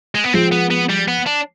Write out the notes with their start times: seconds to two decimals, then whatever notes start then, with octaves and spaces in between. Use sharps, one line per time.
0.15 G#3
0.24 B3
0.33 F3 G#3 C4
0.52 B3
0.71 B3
0.90 G3
1.08 B3
1.26 D4